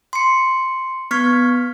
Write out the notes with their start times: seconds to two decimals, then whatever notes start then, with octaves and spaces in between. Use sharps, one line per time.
0.13 C6 C#7
1.11 B3 C#6 F6 G#6 B6